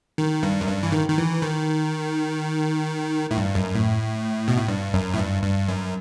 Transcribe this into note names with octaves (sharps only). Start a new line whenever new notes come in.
D#3
G2
F#2
G2
E3
D#3
D#3
E3
D#3
A2
G2
F#2
A2
B2
A2
G2
F#2
A2
G2
G2
F#2